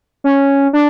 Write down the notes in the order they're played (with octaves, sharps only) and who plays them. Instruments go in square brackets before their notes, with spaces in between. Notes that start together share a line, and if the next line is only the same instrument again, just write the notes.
[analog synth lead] C#4
D4